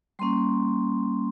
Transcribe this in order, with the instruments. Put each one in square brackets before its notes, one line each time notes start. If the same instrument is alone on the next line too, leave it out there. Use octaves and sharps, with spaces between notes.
[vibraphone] G3 A#3 C#4 C6